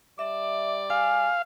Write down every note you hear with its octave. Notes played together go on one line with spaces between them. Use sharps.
G3 D5 E5
F5 G#5